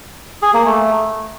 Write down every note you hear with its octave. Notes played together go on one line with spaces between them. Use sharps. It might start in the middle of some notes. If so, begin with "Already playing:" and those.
G#4
A#3
A3